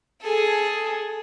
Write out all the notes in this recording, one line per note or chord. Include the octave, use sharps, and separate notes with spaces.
G#4 A4